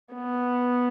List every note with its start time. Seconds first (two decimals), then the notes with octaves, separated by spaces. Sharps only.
0.14 B3